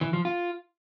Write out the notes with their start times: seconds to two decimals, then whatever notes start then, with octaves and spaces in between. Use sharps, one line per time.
0.01 E3
0.13 F3
0.25 F4